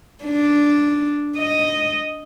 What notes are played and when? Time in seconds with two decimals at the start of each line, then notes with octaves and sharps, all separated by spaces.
0.25 D4
1.38 D#5